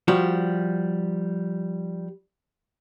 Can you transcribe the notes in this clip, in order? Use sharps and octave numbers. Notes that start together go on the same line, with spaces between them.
F3 G3 F#4